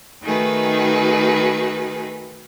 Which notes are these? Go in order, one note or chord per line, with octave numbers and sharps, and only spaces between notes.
D#3 A3 D#4 F#4 G#4 B4